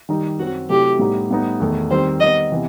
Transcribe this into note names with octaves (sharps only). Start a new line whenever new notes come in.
D#3 G3 D#4
F#2 F#3 C4 F#4
C3 F#3 A3 E4 G4
A2 G3 B3 D#4
A2 G3 B3 D#4
E2 D#3 A3
D#3 G3 C4 C5
D#3 G3 B3 D#5
C3 E3 B3